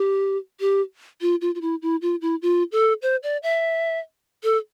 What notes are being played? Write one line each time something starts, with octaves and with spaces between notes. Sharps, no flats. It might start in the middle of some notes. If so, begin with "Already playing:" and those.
Already playing: G4
G4
F4
F4
F4
E4
E4
F4
E4
F4
A4
C5
D5
E5
A4